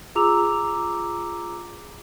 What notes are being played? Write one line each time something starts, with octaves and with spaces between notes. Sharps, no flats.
F4 G#4 A#5 D6 E6 F7